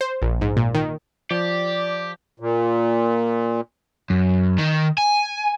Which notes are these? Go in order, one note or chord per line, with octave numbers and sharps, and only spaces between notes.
C5
A#1
G#2
A#2
D#3
F3 G4 D5
A#2
F#2
D#3
G#5